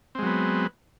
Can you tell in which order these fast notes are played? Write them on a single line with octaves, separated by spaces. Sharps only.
C4 G#3 F#3 B3